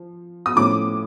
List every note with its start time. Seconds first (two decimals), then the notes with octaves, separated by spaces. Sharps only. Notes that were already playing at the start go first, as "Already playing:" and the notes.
Already playing: F3
0.46 D#6
0.56 A2 F3 A3 C#4 D6